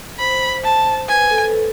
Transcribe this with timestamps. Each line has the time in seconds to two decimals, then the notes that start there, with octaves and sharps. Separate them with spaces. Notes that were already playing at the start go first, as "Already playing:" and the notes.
0.19 C5 B5
0.64 A5
1.09 B4 G#5
1.30 A4